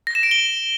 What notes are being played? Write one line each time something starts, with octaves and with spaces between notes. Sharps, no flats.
A#6
E7
D7
G7